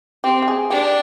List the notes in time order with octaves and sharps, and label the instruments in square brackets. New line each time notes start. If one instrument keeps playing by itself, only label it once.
[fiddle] C4 [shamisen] G4
[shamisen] G4
G#4
[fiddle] D4 [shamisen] G4